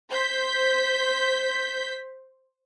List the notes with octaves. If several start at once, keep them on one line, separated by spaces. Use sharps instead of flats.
C5 G6 B6